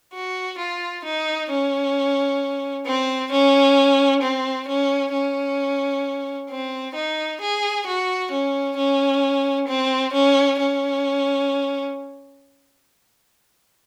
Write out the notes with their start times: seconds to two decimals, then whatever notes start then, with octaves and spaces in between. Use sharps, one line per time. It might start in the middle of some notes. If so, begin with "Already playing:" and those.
0.14 F#4
0.59 F4
1.05 D#4
1.50 C#4
2.86 C4
3.32 C#4
4.22 C4
4.68 C#4
5.13 C#4
6.50 C4
6.95 D#4
7.41 G#4
7.87 F#4
8.32 C#4
8.77 C#4
9.68 C4
10.13 C#4
10.59 C#4